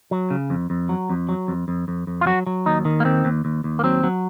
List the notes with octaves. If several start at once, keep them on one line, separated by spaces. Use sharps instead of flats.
F#3
C#3
F2
F2
F#3
F2
F#3
F2
F2
F2
F2
F4
F#3 F#4
F#3
D#2 D#4
D#3
A#3
D#2 C4
D#2
D#2
D#2
A#3
F#3 C4
F#3